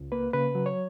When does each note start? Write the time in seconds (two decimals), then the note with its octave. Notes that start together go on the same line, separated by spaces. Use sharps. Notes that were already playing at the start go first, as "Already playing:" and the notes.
Already playing: C#2
0.12 A#3 B4
0.33 C#3 B4
0.55 F#3
0.66 C#5